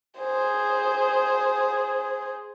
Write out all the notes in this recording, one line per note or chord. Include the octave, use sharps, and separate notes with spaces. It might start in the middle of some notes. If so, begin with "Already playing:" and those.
G#4 C5